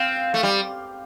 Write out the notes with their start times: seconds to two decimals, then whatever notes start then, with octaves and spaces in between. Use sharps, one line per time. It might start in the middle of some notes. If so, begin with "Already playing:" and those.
Already playing: C4 F5
0.34 A3
0.43 G3